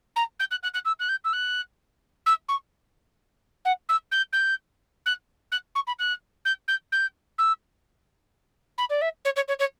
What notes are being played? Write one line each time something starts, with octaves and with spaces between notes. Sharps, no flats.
A#5
G6
F#6
F#6
F#6
E6
F#6
G6
E6
F#6
E6
C#6
F#5
E6
G6
G6
F#6
F#6
C#6
B5
F#6
G6
G6
G6
E6
B5
D5
E5
C#5
C#5
C#5
C#5